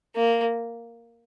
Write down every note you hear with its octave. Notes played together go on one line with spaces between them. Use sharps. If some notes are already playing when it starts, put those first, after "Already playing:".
A#3